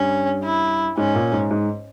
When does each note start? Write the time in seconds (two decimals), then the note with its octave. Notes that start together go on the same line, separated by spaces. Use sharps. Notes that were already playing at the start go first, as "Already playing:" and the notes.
Already playing: G2 C#4
0.44 E4
0.97 G#2 C#4
1.15 A#2
1.32 G#2
1.51 G#2